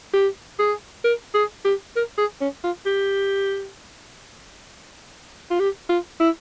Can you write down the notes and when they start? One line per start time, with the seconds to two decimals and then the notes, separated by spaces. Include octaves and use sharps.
0.13 G4
0.59 G#4
1.04 A#4
1.34 G#4
1.65 G4
1.96 A#4
2.18 G#4
2.41 C#4
2.64 F4
2.86 G4
5.50 F4
5.59 G4
5.89 F4
6.20 E4